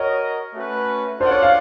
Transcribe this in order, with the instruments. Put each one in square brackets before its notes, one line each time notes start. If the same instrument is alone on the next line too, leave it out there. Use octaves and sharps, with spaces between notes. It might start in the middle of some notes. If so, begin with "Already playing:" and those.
Already playing: [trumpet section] F#4 A#4 D#5 [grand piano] C#5
[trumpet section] A3 C#4 F#4 B4
[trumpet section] D4 F4 A4 D5 F#5 [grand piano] C5
[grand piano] C#5
F5